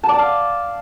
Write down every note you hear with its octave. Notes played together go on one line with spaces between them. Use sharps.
A5
D5
A5
F5